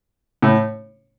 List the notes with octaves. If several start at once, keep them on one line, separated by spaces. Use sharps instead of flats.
A2